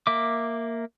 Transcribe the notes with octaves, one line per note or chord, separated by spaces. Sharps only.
A#3 E5 D6